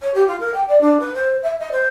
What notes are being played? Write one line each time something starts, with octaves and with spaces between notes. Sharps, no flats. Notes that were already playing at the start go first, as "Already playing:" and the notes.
C#5
G4
F4
A#4
G5
D5
D4
B4
C5
E5
D#5
C5